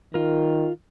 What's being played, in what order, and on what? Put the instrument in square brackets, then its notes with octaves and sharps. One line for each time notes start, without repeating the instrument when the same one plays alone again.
[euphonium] D#3 [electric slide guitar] F4 A#4